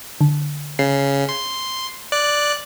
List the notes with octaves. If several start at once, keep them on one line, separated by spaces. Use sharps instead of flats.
D3
C#3 C7
C6
D5 F#6